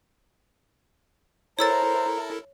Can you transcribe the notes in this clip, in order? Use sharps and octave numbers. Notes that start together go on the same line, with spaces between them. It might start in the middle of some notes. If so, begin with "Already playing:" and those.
E4 A4 A#4 C5 C#5 A#5 E6 A6